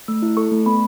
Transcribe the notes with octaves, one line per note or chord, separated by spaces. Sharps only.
A3 E6
E4
A4 C#6
A3
B3 B5